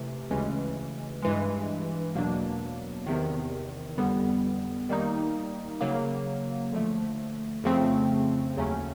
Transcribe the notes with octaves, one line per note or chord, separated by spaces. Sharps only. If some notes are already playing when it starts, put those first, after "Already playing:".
Already playing: C3 E3 A3
D2 C#3 E3 G#3 C#4
G2 E3 G#3
E2 B2 F#3 A#3 D4
E2 C3 D#3
F2 D3 G3 B3
D#3 G3 A#3 D#4
C#3 F#3 A#3
D3 F3 A3
F2 C#3 F3 A3 C4
D#2 C#3 F#3 A3 C#4